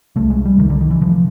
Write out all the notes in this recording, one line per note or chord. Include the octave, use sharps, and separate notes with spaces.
C2 C3 A3
G#3
G3
C2 C3 D#3
D3
D#3
E3
C3 F3